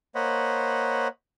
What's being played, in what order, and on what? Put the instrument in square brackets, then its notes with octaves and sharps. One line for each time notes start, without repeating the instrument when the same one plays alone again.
[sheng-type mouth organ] A#3 C5 C#5 D#5 F#5 B5